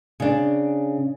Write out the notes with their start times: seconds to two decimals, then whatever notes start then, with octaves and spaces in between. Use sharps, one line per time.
0.20 C#3 D4